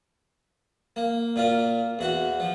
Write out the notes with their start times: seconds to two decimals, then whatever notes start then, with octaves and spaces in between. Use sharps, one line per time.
0.96 A#3
1.36 A#2 F4 A#4
1.99 E2 F#4 F#5
2.40 F3